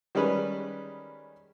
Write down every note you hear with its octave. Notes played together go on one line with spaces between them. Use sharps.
D#3 G3 G#3 C#4 B4